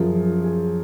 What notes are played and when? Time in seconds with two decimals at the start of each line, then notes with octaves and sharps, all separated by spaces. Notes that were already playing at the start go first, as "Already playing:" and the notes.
Already playing: F#2 F3 G#4
0.44 G#4